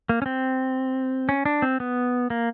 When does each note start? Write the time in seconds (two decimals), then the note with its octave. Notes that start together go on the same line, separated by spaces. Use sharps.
0.09 A#3
0.22 C#4
0.26 C4
1.29 C#4
1.45 D4
1.62 C4
1.80 B3
2.30 A#3